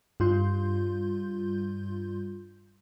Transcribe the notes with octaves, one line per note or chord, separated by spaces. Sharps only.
G2 G3 F4 C6 G6